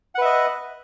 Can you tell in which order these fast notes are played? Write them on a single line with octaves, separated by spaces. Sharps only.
F#5 B4 E5 D#5